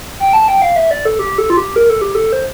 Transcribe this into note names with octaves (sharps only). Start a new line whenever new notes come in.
G5
A5
G5
F5
E5
D5
A4
G4
A4
F4
G4
A#4
A4
G4
A4
C5